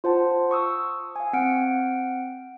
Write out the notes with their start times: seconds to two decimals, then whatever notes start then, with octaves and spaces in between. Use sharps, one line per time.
0.04 F4 C5 F#5 A5
0.51 C#6 D#6 E6
1.16 F5 G#5
1.33 C4 F#5 G5 F6 D7